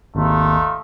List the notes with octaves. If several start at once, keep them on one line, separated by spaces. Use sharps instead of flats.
G#1 D#2 A3 D#4 F4